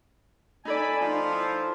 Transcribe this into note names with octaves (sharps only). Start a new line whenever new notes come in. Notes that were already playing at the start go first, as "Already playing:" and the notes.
D#4 A4 D5 G#5 A5 B5
F3 D#4 F4
E4